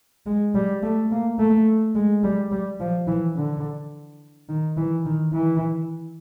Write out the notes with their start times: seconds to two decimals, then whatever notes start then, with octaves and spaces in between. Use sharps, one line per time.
0.26 G#3
0.55 G3
0.83 A3
1.11 A#3
1.39 A3
1.95 G#3
2.23 G3
2.52 G3
2.80 F3
3.07 E3
3.36 D3
4.49 D#3
4.77 E3
5.05 D#3
5.34 E3